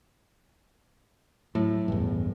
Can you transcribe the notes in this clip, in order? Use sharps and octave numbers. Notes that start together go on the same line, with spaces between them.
A2 F#3
A1 E2 G2